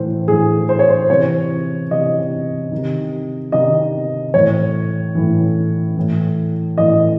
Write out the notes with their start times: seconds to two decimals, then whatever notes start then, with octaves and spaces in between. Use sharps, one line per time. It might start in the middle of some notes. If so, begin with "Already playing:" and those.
Already playing: A2 E3 C5
0.28 A2 E3 G#4
0.69 C5
0.79 C#5
0.89 C5
1.10 C3 E3 C#5
1.91 C3 E3 D#5
2.72 D#3
2.77 C3
3.52 C3 D#3 D#5
4.34 A2 E3 C#5
5.15 A2 E3
5.96 A2 E3
6.78 A2 E3 D#5